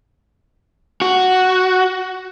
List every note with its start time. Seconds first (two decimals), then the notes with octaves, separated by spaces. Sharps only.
1.02 F#4